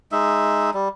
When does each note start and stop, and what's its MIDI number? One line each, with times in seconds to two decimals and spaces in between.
0.12 0.70 56
0.12 0.70 63
0.12 0.70 76
0.74 0.88 55